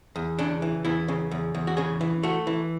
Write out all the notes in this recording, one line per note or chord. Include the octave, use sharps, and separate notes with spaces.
E2
C#3 D4
E3
E2 E4
C#3
E2
E2
F#4
C#3 G#4
E3
A3 F#4
E3